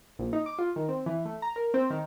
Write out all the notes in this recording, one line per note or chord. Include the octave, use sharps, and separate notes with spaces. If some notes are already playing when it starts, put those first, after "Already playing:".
A#1
D#4
D6
F4
D#3
C4
E3
A3
A#5
A#4
C4
D#3